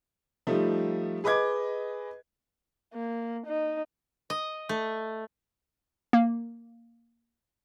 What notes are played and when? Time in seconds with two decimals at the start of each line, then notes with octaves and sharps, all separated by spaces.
0.47 F3 G3 A3 D#4
1.24 G#4 B4 D#5 D6 G#6
2.93 A#3
3.46 D#4
4.30 D#5
4.69 A3
6.13 A#3